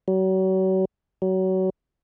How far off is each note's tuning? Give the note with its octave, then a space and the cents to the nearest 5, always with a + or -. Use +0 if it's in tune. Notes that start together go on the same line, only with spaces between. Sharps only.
F#3 +35
F#3 +25